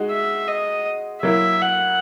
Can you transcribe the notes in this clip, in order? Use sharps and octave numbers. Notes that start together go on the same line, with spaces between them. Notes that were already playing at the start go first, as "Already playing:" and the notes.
Already playing: G#3 D#4 F#4
E5
D#5
F#3 A#3 E4 E5
F#5